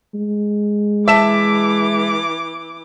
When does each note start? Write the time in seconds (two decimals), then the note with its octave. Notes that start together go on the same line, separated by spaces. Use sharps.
0.14 G#3
1.08 E3 E5 A5 D6 E7